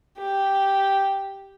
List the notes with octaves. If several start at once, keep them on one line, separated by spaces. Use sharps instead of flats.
G4